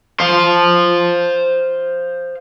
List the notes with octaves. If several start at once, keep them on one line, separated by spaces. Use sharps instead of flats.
C5 F5